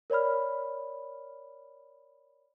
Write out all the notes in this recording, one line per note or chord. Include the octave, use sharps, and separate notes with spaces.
A#4 C#5 D5 B5 F6